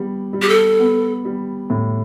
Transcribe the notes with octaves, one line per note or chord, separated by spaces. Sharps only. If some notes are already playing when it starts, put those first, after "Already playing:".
Already playing: G3 B3
G3
G4
A4
B3
G3
A2